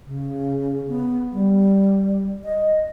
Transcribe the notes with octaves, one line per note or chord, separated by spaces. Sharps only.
C#3
B3
G3
D#5